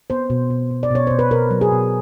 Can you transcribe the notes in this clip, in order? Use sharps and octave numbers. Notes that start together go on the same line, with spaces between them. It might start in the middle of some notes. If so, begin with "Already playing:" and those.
B3 C5
B2
B2
B2
D5
B2 C#5
B2 C5
B4
B2 A#4
F#3
G#4
B2